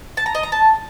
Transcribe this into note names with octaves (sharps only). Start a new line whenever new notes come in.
A5
A#5
D#5
A#5
A5